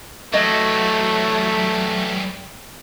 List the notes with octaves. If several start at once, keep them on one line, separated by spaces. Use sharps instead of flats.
E3 F#3 G3 A3 D#5